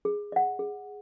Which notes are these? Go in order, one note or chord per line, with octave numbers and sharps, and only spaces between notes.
G#4
D#5 F#5
G#4